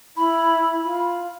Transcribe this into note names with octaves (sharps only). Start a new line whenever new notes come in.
E4 B5
F4